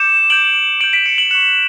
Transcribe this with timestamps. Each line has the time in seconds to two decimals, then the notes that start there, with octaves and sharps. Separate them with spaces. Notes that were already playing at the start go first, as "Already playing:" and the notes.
Already playing: D6 G6 C#7 E7
0.30 D6 G6 D7 F#7
0.81 D6 G6 D7 F#7
0.93 B6 D7
1.06 C#7 E7
1.18 D7 F#7
1.31 C#6 F#6 C#7 E7